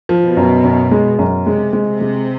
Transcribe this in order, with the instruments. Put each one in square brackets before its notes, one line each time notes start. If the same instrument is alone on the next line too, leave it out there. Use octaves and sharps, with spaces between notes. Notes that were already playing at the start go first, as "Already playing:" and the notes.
[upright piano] F3
[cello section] B2
[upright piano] F#2
F#2
G#3
F#2
[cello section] C3 [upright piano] G#3
[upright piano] G#3
[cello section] C3
[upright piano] G#3